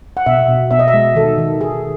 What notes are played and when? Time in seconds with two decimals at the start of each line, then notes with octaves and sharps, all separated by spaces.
0.17 F#5
0.26 B2 E5
0.48 B2
0.71 B2 E5
0.79 D#5
0.88 E5
0.94 G#3
1.15 D#3 A4
1.38 D#3
1.61 D#3 G#4